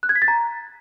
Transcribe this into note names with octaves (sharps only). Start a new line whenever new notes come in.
F#6
G#6
B6
A6
A#5